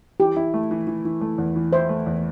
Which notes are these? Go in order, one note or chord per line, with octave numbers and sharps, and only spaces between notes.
E3 G4
E4
A3
E3
E3
E3
A3
E2
E3
E4 C5
A3
E2